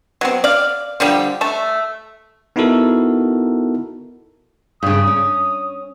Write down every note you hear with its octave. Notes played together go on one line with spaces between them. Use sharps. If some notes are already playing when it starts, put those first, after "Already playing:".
F#3 B3 C4
D5 F5
D3 F3 G3 G4
A3 A5
B3 D#4 E4 F#4 A4 A#4
G2 C#3 D#6
C#4